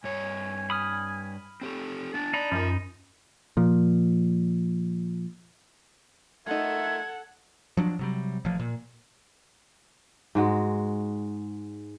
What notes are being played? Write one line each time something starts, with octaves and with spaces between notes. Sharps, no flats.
G2 C#5 G#5
B5 D#6 F6
C4 G4 A4
B3 D4 A5
D4 D#4 D5 A#5 B5
F#2 F3 F4
A#2 F3
A3 D#4 F4 A4 A#4 E5 F#5 G#6
F3 F#3 D4
C3 F#3 G3
A1 F3
A#2
G#2 G#3 F#4